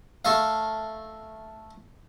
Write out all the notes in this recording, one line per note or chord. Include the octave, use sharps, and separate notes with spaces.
A3 A4 A#4 F5